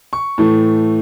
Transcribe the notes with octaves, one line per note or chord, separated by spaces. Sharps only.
C#6
A2 E3 A3